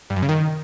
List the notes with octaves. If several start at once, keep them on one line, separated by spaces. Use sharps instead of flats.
G2
F#2
C#3
D#3